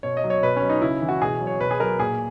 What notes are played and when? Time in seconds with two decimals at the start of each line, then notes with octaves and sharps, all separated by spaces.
0.03 B2 C#5
0.17 D#5
0.24 F#3
0.30 C#5
0.43 B2 B4
0.56 C#4
0.62 F#3
0.70 D#4
0.82 C#3 E4
1.02 E3
1.09 F#4
1.21 B2 G#4
1.40 F#3
1.47 C#5
1.60 B2 B4
1.71 G#4
1.80 F#3 A#4
1.99 A#2 G#4